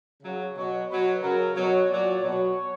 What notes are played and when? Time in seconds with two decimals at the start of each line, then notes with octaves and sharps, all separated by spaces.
0.23 C#3 F#3
0.56 B2 F#3 C#5
0.89 B2 F#3 B4
1.22 C#3 F#3 A#4
1.56 B2 F#3 C#5
1.89 A#2 F#3 D5
2.23 B2 F#3 C#5